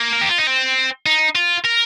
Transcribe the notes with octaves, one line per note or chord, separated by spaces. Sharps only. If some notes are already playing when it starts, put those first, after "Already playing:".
Already playing: A#3
A#4
G4
F4
D#4
C4
D#4
F4
A#4